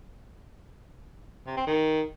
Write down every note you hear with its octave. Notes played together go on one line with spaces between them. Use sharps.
C3
C4
D#3